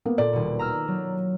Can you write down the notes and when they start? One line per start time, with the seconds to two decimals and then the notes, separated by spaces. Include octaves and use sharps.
0.05 A#3 B3
0.18 A#2 A4 D5
0.33 D#1 B2
0.59 A#5 E6 F6
0.88 F#3